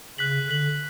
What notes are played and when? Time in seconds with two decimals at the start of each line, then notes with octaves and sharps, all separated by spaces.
0.18 C#3 F#6 B6 F#7
0.48 D3 F#6 B6 F#7